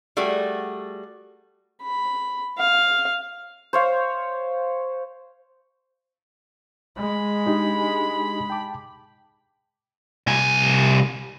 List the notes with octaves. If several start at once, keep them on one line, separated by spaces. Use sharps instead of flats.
G3 A3 F#4 G#4
B5
F5
C5 C#5 F5
G#3 B5
D4 D#4 G4
G5 A5 D6
C2 G#5